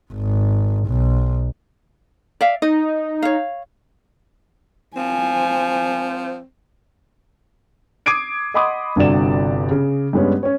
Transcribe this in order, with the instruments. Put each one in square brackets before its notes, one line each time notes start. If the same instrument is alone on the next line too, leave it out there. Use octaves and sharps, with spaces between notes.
[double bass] G#1
B1
[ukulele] D5 E5 F5
[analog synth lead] D#4 [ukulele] D#5
[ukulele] C#5 F5
[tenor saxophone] F3 [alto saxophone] C4 [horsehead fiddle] G#5
[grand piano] D6 D#6 G#6 C7 D7 D#7
D#5 F#5 B5 C6 D6 D#6
G1 G2 C3 F#4 D5 E7
C#3
G2 G3 G#3 B3 C#4
C#4 C#5